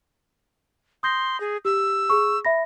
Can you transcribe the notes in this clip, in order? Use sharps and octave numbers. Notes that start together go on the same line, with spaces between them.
C6 D#6 G6 A#6
G#4
G4 E6
G#4 C#6
E5 B5 A#6